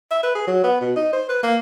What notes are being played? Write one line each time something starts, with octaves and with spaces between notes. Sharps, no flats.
E5
B4
G#4
F#3
B3
B2
D#4
C5
B4
A#3